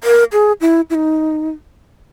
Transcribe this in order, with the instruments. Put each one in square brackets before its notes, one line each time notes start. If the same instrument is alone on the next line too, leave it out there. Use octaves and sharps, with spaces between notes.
[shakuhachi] A#4
G#4
E4
E4
D#4